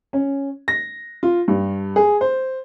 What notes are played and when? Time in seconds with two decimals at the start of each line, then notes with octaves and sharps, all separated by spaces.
0.13 C#4
0.68 A#6
1.23 F4
1.48 G2
1.96 G#4
2.21 C5